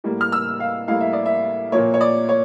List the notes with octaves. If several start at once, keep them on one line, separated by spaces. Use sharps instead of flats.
A2 G3 A#3
F6
E6
F5
A2 G3 A#3 F5
E5
D5
E5
A#2 F3 A#3 C#5
C#5
D5
C#5